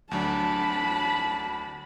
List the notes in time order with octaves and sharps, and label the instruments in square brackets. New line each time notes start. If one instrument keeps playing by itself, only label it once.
[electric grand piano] D2 F#3 D4 [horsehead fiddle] A5 B5